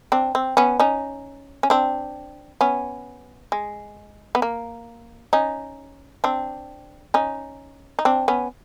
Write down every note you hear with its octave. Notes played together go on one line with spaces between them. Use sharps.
C4 D4
C4
B3 C#4
C#4 D#4
C#4
C4 D4
B3 C#4
G#3
B3
A#3
C#4 D#4
C4 D4
C#4 D#4
D#4
C4 D4
B3 C#4